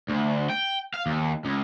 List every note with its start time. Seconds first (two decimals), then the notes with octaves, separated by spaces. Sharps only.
0.09 D2
0.50 G5
0.94 F5
1.06 D#2
1.45 C#2